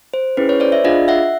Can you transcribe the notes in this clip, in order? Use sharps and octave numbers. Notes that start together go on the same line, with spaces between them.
C5
C#4 E4 G#4 B4
B4 C#5
C5 D5
D5 E5
D4 F4 G#4 D#5 F5
E5 F#5